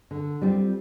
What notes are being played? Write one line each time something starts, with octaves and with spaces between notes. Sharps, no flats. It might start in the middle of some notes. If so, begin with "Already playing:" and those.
D3
G3 C4 F4